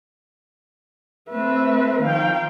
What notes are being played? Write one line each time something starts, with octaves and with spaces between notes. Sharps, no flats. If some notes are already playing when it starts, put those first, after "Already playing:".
A3 C4 B4 E5
D#3 F3 F5 G5